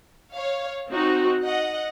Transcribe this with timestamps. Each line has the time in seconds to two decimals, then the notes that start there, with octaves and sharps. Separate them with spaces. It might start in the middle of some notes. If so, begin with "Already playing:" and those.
0.34 C#5 F5
0.90 C4 D#4 F#4
1.45 D#5 F#5